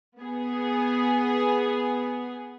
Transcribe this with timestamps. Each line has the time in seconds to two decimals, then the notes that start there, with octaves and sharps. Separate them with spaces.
0.19 B3 G#4